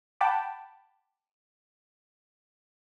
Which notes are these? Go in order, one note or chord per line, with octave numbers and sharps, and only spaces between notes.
F#5 G5 A5 B5 D6